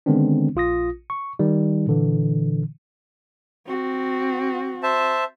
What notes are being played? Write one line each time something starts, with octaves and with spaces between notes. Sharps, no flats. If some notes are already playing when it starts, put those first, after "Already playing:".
D3 D#3 G#3 B3 C4 D4
A#1 F4 D#6 A#6
C#6
D#3 G3 D#4
A#2 D3 E3
C4 F#4
C5 E5 A5